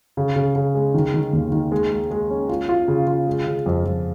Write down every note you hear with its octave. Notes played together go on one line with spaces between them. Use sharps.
C#3
C#3
C#3
G#3
D#3
D#3
D#2
D#3
G#3
G#3
G#3
C#4
F4
F4
C#3
F4
G#3
C#3
F2
F2